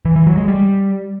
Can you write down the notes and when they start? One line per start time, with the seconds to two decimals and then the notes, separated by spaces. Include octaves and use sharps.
0.05 E3
0.16 E3
0.27 F#3
0.37 G#3
0.48 G3